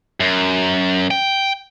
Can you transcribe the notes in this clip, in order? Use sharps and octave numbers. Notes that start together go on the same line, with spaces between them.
F#2
G5